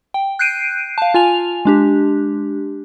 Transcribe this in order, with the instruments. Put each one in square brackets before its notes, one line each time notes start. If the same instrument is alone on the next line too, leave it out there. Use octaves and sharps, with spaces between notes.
[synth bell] G5
F#6 G6 C7 D7 D#7
F5 A5
F4 G#5 F7
G#3 D4 G4